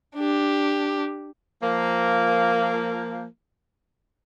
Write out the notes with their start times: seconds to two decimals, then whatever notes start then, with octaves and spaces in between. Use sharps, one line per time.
0.15 D4 G4
1.63 F3 A#3